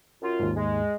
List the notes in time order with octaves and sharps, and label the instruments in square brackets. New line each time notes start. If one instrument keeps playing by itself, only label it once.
[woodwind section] F#2 F4
[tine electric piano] D#2 G#2
[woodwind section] G#3